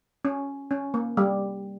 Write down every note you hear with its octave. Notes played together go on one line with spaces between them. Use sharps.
C#4
C#4
A#3
G3